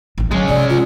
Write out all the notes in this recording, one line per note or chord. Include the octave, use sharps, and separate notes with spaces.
A1 D#4
D3 F#3 G#3 C#4
C3 F3 D5
F4